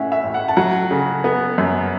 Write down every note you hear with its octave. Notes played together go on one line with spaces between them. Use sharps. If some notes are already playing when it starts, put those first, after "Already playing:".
Already playing: A2 C#4 E5 F#5
E5
A1
F#5
A5
F#3 F#5
C#3
B3
F#2